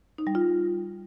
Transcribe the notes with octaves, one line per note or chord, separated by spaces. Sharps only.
D#4
G3
F4